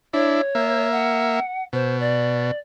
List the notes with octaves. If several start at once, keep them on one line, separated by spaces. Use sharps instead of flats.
D4 E4 C#5
A#3 E5
F#5
B2 C5
D5